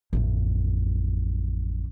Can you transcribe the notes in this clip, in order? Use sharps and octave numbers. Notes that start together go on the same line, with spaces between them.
A1 F2